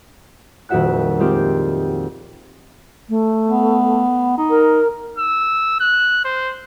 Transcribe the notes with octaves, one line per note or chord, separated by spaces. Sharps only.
D#1 F2 F#4 E5 F#5 F#6
G#3 C4 F4 G4
A3
B3
D#4
A#4
E6
F#6
C5